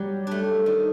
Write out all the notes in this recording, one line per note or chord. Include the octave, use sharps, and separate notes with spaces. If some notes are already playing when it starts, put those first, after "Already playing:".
Already playing: F#3 G3
A3 D4
D#3